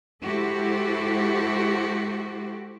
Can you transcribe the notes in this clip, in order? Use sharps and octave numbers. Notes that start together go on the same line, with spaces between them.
G#3 E4 F#4 G4 A4 C5